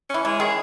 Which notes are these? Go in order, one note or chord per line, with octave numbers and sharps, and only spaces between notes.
E3 C#4
E3 G#3
D#3 G#4